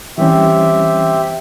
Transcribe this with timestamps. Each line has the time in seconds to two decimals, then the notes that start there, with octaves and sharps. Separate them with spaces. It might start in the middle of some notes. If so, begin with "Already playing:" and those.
0.18 E3 G3 C4 C#4 G4 E5